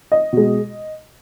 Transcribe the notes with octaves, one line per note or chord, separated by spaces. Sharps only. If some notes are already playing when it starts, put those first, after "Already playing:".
D#5
B2 G#3